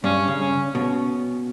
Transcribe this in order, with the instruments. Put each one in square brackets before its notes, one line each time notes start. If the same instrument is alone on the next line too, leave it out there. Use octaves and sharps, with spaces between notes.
[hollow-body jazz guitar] G2 [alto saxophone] C#4
[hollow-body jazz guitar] C#3
[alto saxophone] C#4
[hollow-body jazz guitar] B2 [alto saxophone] C#4